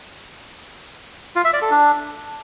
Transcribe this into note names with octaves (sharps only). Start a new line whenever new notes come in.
F4
E5
D5
A4
D4